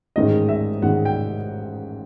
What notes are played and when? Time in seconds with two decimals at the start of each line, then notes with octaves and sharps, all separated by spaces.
0.16 A1 G#2 D#3 G#3 D#5
0.49 E5
0.82 A1 G#2 D#3 G#3 F#5
1.05 G5